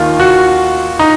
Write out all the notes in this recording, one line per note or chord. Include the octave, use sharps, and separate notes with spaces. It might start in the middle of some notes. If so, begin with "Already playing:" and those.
Already playing: D#2 D#3 F4
F#4
D#4